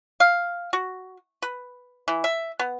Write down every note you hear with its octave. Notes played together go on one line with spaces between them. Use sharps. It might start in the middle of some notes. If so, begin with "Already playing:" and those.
F5
F#4
B4
E3
E5
B3